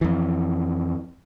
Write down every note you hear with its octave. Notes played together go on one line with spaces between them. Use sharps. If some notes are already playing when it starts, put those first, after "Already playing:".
F2 E3